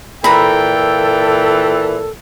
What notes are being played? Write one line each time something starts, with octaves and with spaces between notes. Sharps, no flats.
A#2 E3 A4 G5 A#5 B5